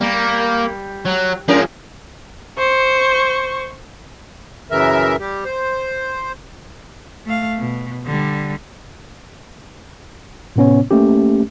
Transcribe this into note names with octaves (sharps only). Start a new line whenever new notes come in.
G3 A#3
F#3
F3 G#3 C#4 A#4
C5 C#6
F#2 C#3 E3 A#4 E5
G3 G4
C5
A3 F5
B2
D3 G3
A2 C3 B3 C#4 C#5
A3 A#3 C#4 G4